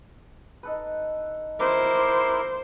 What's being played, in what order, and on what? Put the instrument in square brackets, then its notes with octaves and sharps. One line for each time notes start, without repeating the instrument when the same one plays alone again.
[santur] D#4 A4 B4
[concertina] E4 A#4 [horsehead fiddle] C5 [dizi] D6